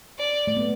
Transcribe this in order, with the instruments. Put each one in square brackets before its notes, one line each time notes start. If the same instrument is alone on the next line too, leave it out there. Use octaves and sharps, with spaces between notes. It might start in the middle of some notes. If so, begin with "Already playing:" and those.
[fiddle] D5
[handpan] A3
B3